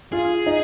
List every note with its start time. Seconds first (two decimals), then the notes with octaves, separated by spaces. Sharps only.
0.12 F4 G#4
0.46 D#4